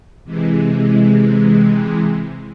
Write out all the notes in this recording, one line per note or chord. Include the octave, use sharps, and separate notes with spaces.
C3 E3 G#3